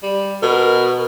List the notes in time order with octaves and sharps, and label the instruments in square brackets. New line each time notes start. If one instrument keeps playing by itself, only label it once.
[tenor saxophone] G3
[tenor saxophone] B2 [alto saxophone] A#4